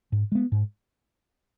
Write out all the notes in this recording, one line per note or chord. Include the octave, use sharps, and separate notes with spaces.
G#2
G#3 B3
G#2